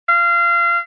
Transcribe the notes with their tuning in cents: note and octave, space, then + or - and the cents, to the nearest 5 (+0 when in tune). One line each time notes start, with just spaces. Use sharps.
F5 -25